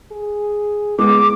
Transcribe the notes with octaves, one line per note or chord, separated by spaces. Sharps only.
G#4
G#3 B3 D6